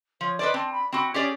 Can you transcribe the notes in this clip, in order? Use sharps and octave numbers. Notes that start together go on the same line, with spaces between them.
F3 C#5
B4 C5 D5 D#5
C4 A5
B5
C4 F#4 B5
C#4 G4 G#4 D5